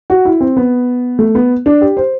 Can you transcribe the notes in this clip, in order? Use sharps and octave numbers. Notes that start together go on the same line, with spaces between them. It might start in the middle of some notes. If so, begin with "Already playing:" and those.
F#4
E4
C4
B3
A3
B3
D4
G4
C5